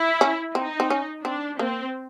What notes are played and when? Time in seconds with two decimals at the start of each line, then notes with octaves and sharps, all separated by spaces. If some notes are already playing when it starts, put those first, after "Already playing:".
Already playing: E4
0.21 C#4
0.55 C4 D#4
0.80 C4
0.90 C#4
1.24 C4 D4
1.59 A#3 C4